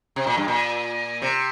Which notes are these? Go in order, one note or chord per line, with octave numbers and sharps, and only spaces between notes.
C3
A#2
G2
A#2
C3